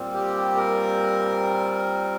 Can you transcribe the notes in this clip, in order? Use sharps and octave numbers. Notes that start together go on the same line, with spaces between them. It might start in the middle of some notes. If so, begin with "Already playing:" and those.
Already playing: A#2 G3 C4
G4
A#4